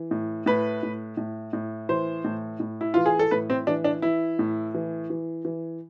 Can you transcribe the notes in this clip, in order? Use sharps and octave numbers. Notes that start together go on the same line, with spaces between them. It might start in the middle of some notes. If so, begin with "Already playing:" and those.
Already playing: E3
A2
A2 B4
A2
A2
A2
E3 C5
A2
A2
E4
E3 F4
G#4
A4
A2 B4
C4
E3 D4
D4
E3 E4
A2
E3
E3
E3